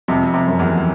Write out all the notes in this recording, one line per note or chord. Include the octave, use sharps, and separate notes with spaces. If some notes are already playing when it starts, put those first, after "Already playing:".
F2 C3
C3
F#2
E2